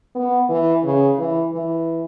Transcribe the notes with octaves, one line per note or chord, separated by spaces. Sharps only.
B3
E3
C#3
E3
E3